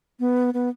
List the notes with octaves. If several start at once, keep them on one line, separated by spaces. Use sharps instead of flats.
B3
B3